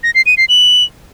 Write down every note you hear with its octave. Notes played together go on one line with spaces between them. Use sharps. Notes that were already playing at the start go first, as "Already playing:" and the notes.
A#6
C7
D#7
C7
F#7